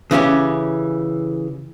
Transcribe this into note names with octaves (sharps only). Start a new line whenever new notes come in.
C#3 E3 C#4 G4